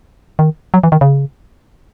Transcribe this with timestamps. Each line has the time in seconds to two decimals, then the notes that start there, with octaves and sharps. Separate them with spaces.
0.39 D#3
0.74 F#3
0.84 E3
0.92 D#3
1.01 C#3